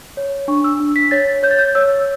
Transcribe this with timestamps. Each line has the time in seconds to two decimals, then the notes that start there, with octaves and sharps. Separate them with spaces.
0.17 C#5
0.48 D4 C#6
0.64 E6
0.80 D4
0.96 B6
1.11 C#5 A6
1.43 C#5 G6
1.51 A6
1.59 G6
1.75 C#5 E6